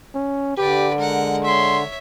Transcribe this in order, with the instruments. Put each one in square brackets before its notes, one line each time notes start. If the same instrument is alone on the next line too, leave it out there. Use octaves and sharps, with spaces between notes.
[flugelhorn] C#4
[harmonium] D3 [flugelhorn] G4 [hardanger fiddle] B4 D5
[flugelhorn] G#3 [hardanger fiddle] A#4 F#5
[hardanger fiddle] C#5 E5 [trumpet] C6